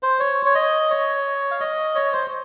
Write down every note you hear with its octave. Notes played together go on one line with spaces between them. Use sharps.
C5
C#5
C#5
D#5
C#5
F5
D#5
C#5
C5